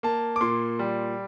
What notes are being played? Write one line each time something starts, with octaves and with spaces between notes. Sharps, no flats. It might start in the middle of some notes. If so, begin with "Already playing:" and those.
A#3 A5
D6
A#2 C6
G3